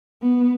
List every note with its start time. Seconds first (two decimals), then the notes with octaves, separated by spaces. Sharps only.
0.22 B3